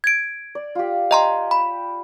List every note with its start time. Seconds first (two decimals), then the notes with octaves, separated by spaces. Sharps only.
0.04 G#6 D7
0.55 D5
0.75 F4 G4
1.11 D#5 G5 A#5 C6
1.51 B5